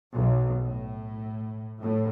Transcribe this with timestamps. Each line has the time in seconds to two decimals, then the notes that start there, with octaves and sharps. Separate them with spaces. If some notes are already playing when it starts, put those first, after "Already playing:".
0.13 B1
0.62 A2
1.80 A2